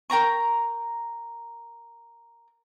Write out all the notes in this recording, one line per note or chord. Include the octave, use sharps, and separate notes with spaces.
A#4 G5 A#5 C#6